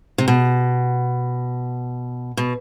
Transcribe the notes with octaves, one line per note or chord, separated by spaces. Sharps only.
C3
B2
B2